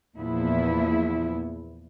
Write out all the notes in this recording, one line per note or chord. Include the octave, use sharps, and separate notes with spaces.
E2 A#2 F3 B3 E4